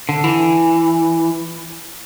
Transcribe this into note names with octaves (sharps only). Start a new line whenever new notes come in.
D3
E3